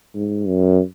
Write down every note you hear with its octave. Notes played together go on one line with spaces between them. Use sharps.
G#2
F#2